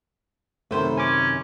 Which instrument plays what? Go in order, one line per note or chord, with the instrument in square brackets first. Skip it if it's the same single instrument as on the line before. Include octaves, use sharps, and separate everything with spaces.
[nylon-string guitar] F#2 C3 D#3 [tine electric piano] A3 [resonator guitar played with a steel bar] B4 C5
[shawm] C#4 [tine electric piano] G#5 D6